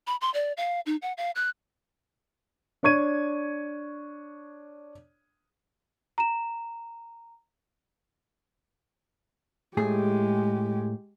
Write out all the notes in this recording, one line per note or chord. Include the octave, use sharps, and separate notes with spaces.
B5
C6
D5
F5
D#4
F#5
F5
F#6
D4 C#5 C#6 G#6 D#7
A#5 E7
A2 G#3 A3 G4 G#4